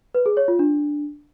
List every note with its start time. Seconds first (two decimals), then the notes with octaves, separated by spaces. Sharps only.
0.15 B4
0.26 G#4
0.37 C#5
0.48 F4
0.59 D4